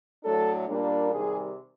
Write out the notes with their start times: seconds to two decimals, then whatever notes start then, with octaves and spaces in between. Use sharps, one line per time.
0.24 A2 F#3 A3 D4 A4
0.67 A#2 G3 A#3 D4
1.11 C3 D#3 G3 G#4